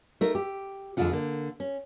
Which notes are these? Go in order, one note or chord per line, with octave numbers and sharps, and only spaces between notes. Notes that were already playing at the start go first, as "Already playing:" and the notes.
A3 D#4 A#4
G4
F2 D3 F#3 G#3 F4 F#5
D3 A#3
C#4